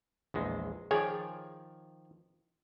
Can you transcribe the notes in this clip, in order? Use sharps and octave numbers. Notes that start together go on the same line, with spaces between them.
A#1 E2 G#3
D#3 F3 G#4 C#5 D5